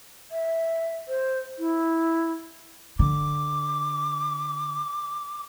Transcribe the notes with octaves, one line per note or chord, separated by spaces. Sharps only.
E5
C5
E4
D3 D6